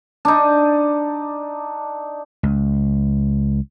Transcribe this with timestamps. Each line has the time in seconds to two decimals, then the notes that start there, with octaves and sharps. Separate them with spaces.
0.25 D4 D#4
2.43 C#2